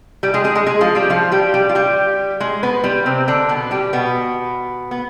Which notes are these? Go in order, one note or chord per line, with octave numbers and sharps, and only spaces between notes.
G3 G4
G#3 G#4
G#3 G#4
G#3 G#4
G#3 G#4
F3 F4
G3 G4
F3 F4
G3 G4
G3 G4
F4
G3 G4
G#3 G#4
B3 B4
G3 G4
C3 C4
D3 D4
B2 B3
G3 G4
B2 B3
B3